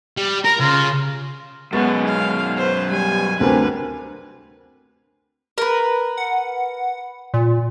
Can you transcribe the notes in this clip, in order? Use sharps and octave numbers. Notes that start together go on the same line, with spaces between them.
G3
A#4 A#5
C#3 F4
F#2 B2 G#3 B3 C#6 A6
F5
B4 C5
G3 G#5
D2 D3 C4 A#4 B4 G#5
A#4 B4
F#5
A#2